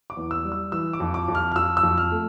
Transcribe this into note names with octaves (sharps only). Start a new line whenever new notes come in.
D6
E2
E6
G3
E6
E3 E6
D6
F2
D6
F2
F6
F6
F2 E6
E6
F2
F6
A3